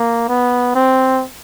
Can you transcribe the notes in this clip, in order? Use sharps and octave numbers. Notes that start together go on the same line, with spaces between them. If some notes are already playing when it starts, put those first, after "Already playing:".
Already playing: A#3
B3
C4